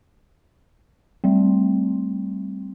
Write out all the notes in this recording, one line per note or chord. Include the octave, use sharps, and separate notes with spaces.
G3 A3 C4